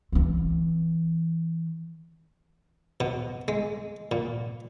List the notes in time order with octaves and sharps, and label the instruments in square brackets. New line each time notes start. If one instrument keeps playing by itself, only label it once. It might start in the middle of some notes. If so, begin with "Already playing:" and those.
[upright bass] E3 C4
[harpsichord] B2
G#3
A#2